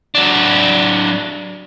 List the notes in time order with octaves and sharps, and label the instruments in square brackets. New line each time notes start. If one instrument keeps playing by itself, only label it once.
[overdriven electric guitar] F#3 D4